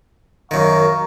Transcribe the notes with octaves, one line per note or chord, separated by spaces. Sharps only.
F#2 D#3 F5 A#5 C#6